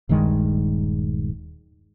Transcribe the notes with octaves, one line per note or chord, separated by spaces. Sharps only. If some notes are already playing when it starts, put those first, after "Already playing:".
D#1 G2 D#3 G#3